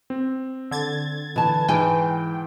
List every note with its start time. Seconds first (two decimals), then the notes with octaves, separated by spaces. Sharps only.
0.10 C4
0.71 D3 G#6 A6
1.36 E3 A5
1.69 G#2 E3 G5 G#5